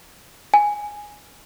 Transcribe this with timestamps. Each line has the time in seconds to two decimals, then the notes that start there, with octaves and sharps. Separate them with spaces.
0.54 G#5